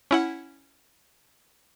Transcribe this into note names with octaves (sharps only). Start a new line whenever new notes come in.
C#4 E4 F#5